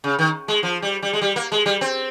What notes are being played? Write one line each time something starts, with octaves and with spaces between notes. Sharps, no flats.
C#3
D#3
G#3
F3
G3
G3
G#3
G3
A#3
G#3
G3
C4